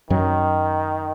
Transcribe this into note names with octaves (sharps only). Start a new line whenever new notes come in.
F#2 D#3 F#3